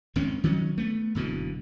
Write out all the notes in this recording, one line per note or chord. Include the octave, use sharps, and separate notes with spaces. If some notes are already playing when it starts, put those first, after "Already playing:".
G#1 D#3 C4 C#4
D#3 F#3 C#4
A3 B3
F#1 B2 D3 E3